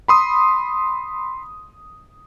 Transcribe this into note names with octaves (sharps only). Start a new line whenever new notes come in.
B5 C6 D#6